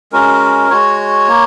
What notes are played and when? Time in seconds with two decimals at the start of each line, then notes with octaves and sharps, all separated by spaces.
0.12 G#3 C#4 F#4 A#4
0.70 G#3 F#4 C#5
1.28 A#3